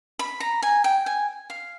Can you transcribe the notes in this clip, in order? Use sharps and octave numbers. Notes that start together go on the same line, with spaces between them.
B5
A#5
G#5
G5
G#5
F5